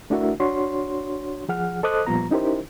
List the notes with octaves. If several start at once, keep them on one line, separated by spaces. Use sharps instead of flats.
A3 D4 E4 F#4 A#4 E5
D4 F#4 C#5 C6
F3 G#4 F#5 F6
A4 C5 D#5 D6 D#6 F#6
A#2 F3 G3 B3 F4 A#5
C#4 D#4 E4 G4 A#4 C5